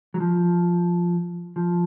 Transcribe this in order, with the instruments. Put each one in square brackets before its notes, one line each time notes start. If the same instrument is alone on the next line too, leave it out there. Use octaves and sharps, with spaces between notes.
[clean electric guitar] F#3
F3
F3